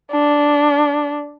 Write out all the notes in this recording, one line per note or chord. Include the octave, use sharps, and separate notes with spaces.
D4